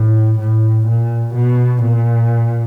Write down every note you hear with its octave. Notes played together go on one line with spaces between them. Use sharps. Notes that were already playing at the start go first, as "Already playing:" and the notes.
Already playing: A2
A2
A#2
B2
A#2